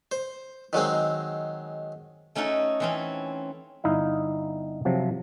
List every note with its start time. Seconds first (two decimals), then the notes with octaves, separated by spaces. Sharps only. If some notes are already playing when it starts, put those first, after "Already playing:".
0.12 C5
0.73 D#3 F#3 G#3 C4
2.35 A3 C#4 D#4 F#4 A4
2.80 E3 C4 C#4
3.84 G1 D#4 E4 F5
4.85 C3 F3 F#3